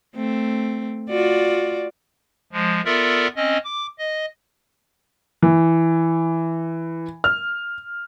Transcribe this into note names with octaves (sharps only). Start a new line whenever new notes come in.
A3 C4
F4 F#4 D5
F3 G#3
B3 F4 A4 A#4 D5 E5
C4 C#4 D#5
D6
D#5
E3
F6